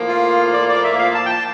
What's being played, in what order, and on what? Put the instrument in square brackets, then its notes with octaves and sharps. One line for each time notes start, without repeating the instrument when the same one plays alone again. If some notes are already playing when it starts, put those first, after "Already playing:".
Already playing: [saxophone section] A2 F3 A#3
[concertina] F4
D5
D5
E5
F5
A5
G5
A5